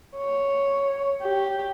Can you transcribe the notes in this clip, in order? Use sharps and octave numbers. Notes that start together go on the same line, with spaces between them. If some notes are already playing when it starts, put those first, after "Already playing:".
C#5
G4